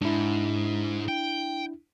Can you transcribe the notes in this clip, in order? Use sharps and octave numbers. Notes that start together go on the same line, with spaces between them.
G#2 D4 E4
G5